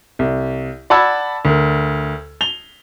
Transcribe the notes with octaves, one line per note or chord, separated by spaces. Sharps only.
C2
D5 F#5 A5 B5 E6 G#6
D2 A#4
F7 G7